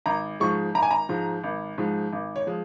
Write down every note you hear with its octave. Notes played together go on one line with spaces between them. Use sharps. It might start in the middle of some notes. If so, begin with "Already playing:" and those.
G#1 A#5
G#2 F3 G#3 C#6
G#1 A#5
G#5
A#5
G#2 F3 G#3
G#1
G#2 F3 G#3
G#1
C#5
F3 G#3